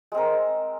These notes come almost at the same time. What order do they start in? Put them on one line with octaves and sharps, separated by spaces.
G#3 C4 A#4